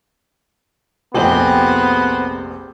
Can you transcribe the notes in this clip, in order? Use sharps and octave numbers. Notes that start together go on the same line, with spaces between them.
F1 A#1 B3 C4 G4 G#4 G5